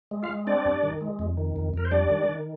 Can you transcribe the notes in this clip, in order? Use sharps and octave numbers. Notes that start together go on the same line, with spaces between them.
G#3
F4 F5
G#3
C4 D4 D5
G2
D#3
G#3
F2
D#3
F2
F2 A#4
C5
G3 D4 D5
D#3
D#3